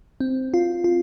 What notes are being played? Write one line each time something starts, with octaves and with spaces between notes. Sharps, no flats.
C4
F4
F4